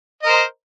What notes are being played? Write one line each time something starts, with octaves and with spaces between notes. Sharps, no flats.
A#4 C5 D#5